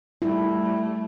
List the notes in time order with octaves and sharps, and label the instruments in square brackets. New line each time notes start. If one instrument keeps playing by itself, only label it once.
[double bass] G3 A3 [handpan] E4